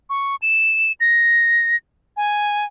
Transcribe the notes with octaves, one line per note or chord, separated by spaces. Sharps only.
C#6
E7
A#6
G#5